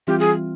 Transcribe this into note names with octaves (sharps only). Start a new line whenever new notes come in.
E3 G3 C4 F4 G4
G#4